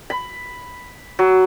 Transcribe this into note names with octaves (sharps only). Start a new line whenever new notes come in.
B5
F#3